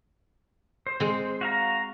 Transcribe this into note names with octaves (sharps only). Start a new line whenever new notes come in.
C5
G#3 C4
F#4 F5 A#5